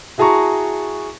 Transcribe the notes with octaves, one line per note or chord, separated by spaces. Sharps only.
E4 F#4 G#4 A5 A#5 C#6